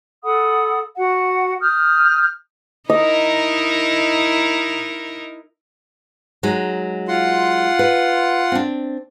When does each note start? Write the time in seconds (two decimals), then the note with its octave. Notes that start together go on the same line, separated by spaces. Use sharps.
0.23 A4 F#5 B5 D#6
0.98 F#4 F#5
1.61 D#6 F6 G6
2.90 D#4 E4 A#4 D#5
6.43 F#3 G#3 D#4
7.08 F4 F#5 C6
7.79 B4
8.52 C4 D4